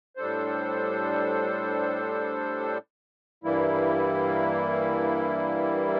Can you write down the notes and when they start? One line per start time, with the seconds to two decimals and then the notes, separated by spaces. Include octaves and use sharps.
0.16 A2 G3 D4 A4 C5
3.44 G2 E3 G3 A#3 E4